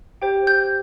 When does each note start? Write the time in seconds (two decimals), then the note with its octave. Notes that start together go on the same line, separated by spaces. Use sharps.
0.22 G4 C5 G5
0.47 G6